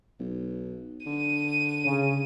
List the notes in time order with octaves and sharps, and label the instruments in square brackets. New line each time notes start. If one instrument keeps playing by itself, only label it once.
[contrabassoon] B1
[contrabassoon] D3 [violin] D#7
[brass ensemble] C#3